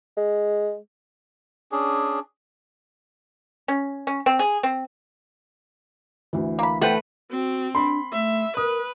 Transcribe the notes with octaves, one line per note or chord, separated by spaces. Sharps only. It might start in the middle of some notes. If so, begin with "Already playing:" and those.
G#3
C#4 D4 G#4
C#4
C#4
C4
G#4
C4
D2 E3
A#3 B5
A3 B3 C4 B4 G5
C4 F#4
D4 B5 C6
A3 E5
A#4 B4 D#6